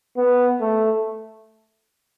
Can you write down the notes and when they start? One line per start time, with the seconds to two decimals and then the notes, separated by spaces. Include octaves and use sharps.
0.17 B3
0.60 A3